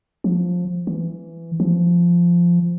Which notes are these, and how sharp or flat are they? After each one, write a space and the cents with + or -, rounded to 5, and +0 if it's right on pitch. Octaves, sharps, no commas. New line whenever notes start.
F3 +15
E3 +15
F3 -10